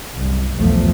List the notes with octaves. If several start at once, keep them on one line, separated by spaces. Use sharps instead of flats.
F#1 C2
F1 B1 E2 G2 F3 A3